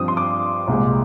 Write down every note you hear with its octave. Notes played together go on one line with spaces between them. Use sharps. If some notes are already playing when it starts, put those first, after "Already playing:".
Already playing: G2 F3 C4 D#6
C6
D6
C2 A#2 G#3